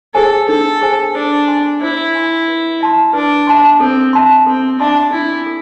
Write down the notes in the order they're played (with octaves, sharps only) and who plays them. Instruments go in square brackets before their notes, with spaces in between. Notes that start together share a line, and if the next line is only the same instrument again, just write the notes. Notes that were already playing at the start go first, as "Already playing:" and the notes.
[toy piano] G#4 C5 G#5 [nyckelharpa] A4
[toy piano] D4 [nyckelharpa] A4
[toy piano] G#4 C5 G#5
[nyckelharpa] D4 [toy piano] C5
[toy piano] G#5 C6
[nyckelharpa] E4 [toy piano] C5
[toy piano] G#5 C6
B4
E5 A5 C6
[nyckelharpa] D4 [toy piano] B4
[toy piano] E5 A5 C6
[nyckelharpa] C4 [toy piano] A4
[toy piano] E5 A5 C6
[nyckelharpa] C4 [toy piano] A4
[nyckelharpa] D4 [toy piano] E5 A5 C6
[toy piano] D4 [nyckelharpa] E4
[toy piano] A4